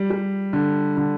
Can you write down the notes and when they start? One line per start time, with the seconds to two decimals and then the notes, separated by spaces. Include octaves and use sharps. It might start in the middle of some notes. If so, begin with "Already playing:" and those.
Already playing: G3
0.10 G3
0.53 D3
0.97 D3